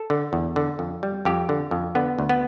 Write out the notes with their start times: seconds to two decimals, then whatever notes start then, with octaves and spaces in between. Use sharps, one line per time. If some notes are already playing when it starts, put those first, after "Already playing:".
Already playing: A4
0.10 D3
0.33 E2
0.56 D3
0.79 F2
1.03 G3
1.25 F2 G4
1.49 D3
1.71 F2
1.95 D3 B3
2.19 D2
2.29 B3